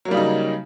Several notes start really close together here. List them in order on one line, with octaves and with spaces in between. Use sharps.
F#3 A#3 G3 C#3 D#4